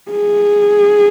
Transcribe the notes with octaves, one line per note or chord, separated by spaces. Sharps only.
G#4